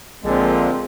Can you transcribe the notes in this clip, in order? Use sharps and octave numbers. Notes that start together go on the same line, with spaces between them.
A#1 A#2 D3 F3 G#3 A#3 C4